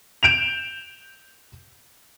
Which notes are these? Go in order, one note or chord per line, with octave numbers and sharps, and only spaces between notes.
G6 D7 E7 F7